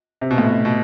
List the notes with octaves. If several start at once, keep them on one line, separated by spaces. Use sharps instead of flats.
C3
B2
A2
B2
B2